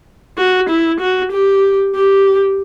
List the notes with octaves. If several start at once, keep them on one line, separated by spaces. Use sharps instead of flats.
F#4
E4
F#4
G4
G4